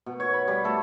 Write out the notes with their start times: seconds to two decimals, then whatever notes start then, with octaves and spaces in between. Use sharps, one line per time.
0.06 B2
0.20 C#5
0.33 B5
0.48 G3
0.64 A3 A4